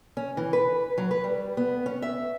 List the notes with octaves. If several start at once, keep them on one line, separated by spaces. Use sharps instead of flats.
C#4
E3
B4
F#3
B4
G3
B3
C#4
E5